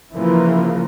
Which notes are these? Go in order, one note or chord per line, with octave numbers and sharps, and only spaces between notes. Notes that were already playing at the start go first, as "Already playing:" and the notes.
C#3 E3 F3 A#3